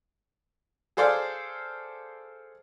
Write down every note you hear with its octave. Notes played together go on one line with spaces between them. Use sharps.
G#4 A4 C5 D5 F5